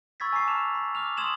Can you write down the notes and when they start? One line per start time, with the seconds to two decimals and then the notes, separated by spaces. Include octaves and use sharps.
0.20 B5 C#6 E6 G#6 A6 B6
0.33 G#5 A#5 D6 C7
0.47 A5 F6 E7 F7
0.75 B5
0.95 D6 F6 F7
1.17 C6 D#6 G#6 E7 F#7